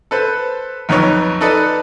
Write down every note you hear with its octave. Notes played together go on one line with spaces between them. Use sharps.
A4 B4 C5
B1 F2 D#4 B4 C#5
D#4 A4 B4 D5 D#5